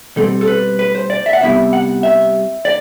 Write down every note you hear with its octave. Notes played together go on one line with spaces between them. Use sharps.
B2 G3 C4 A4
A4
B4
B4
C5
D5
E5
F#5
C2 C3 G3 B3 E4 E5
F#5
E5
D5